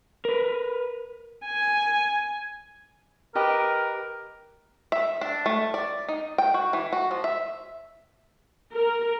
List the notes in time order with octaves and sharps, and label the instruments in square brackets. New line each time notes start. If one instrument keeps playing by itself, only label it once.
[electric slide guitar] A#4 B4
[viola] G#5
[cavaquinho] G4 B4 D#5 [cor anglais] A#4
[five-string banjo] E5
D4
A3
D5
D#4
G5
F#4
E3
F#4
F3
E5
[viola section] A#4